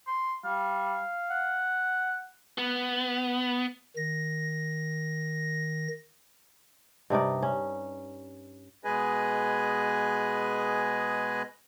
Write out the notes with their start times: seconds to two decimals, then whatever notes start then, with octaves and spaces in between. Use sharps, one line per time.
0.07 C6
0.45 G3 F5
1.31 F#5
2.58 B3
3.96 D#3 A#6
7.10 G2 C3 D#4 D5
7.42 C#4
8.84 B2 G#3 G#4 B4 D#5 G#5